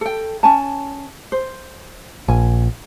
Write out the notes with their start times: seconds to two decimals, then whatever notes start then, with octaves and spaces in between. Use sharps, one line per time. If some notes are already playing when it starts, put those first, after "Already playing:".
0.01 A4 G5
0.43 C#4 G#5 A5
1.32 C5
2.28 A#1 G#5